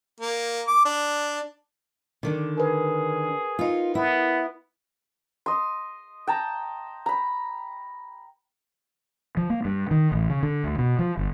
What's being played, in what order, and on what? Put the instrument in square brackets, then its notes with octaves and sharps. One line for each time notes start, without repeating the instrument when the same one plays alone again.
[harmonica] A#3
D6
D4
[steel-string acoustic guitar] D3 D#3 D4
[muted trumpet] G#4 [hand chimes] A#4 B4
[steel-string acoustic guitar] D#4 F4
[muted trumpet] B3 [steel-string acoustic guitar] E4
[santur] D#5 C6
G5 A5 A#5
A#5 B5
[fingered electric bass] F3
A#3
G2
D#3
A1
C#3
D3
D2
B2
F3
G1